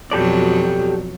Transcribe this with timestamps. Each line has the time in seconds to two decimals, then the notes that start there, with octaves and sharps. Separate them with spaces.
0.11 F2 B2 F#3 G4 A4 D5